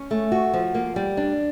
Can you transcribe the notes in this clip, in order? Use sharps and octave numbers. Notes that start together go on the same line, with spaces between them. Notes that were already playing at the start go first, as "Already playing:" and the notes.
Already playing: C#4
A3
F#4
F3
A#3
G3
D4